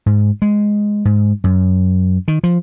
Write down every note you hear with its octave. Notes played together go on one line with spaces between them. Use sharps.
G#2
G#3
G#2
F#2
D#3
F3